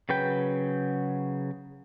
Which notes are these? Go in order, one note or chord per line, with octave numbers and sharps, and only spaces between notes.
C#3 F#3 B4 G5